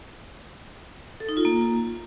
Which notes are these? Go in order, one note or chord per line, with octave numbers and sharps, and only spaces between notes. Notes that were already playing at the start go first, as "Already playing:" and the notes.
A4
D#4
F4
A#3